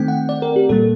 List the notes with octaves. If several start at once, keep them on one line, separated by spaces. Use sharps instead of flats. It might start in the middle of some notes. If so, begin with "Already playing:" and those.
Already playing: D#3 A3 C4 G5
F#5
D5
A#4
G4
A#2 G3 A#3 A4